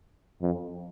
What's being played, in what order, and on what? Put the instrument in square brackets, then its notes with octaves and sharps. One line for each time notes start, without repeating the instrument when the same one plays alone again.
[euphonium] F2